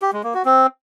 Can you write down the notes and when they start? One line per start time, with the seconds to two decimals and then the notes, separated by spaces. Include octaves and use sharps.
0.02 G4
0.13 G#3
0.24 A#3
0.34 F#4
0.45 C4